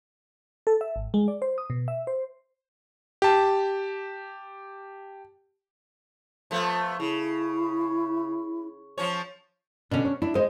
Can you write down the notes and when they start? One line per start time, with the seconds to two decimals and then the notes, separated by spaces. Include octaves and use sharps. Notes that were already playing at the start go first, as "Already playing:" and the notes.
0.67 A4
0.81 E5
0.96 G#1
1.14 G#3
1.28 D5
1.42 C5
1.58 D#6
1.70 B2
1.88 E5
2.07 C5
3.22 G4 A5
6.51 F3 A3 B3
7.00 C#3 E4
8.98 F3 C#4 C#5
9.91 B2 D3 C#4 D4
10.05 C#5
10.22 D4 E4
10.35 G#3 C5 D#5